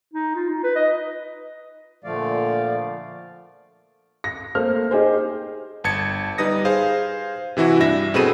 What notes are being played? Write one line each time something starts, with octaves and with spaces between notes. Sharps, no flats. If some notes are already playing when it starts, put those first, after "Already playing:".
D#4
F4
D#4
B4
D#5
A#2 D3 F3 A3 D5 F5
A#6
A3 A#3 C5 F6
D#4 G4 G#4 C5
G1 A5 G#6 C#7
G3 D#4 B4 D#6 A#6
G#4 C5 F5
C3 E3 E4 F#4
G2 D4 E5 A#6
B2 C4 G#4 A4 B5 D#7